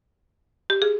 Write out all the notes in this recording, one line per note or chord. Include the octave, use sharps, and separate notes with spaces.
G4
G#4